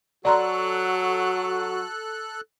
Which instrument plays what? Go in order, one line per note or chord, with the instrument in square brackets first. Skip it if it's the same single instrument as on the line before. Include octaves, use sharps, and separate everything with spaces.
[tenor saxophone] F#3 [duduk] F#4 [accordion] A4 F#6 [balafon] D5 A#5 C6